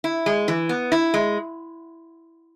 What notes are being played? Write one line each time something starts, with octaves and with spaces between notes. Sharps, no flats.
E4
G#3
E3
B3
E4
G#3